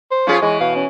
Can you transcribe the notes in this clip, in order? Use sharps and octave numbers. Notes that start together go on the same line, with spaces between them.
C5
F3 C#4 F4 G#4
E3 G#3
B2 F5
C#4